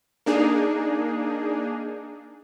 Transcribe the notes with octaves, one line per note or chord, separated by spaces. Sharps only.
A#3 D4 D#4 G#4